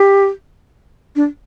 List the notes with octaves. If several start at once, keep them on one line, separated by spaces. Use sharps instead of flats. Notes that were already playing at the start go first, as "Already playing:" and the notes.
Already playing: G4
D4